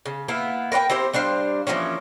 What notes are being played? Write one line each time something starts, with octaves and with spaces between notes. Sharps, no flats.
C#3
A#3 B3 E4 F5
A#4 B4 C#5 G5
C4 E4 G4 C5
G3 D4 C5 F5
E3 F3 A#3 C#4